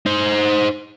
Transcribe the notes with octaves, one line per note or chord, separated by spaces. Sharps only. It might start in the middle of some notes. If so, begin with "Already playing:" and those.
D#4 C5